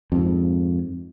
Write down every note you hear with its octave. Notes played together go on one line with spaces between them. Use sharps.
F2 G#2